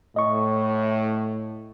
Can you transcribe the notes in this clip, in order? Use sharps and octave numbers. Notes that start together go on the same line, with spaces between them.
A2 D#5 C#6